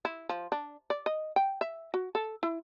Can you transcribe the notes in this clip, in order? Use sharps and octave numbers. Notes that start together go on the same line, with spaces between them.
E4
F3
D4
D5
D#5
G5
E5
F#4
A4
E4